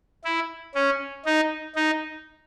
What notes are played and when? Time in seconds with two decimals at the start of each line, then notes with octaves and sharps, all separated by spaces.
0.25 E4
0.75 C#4
1.25 D#4
1.76 D#4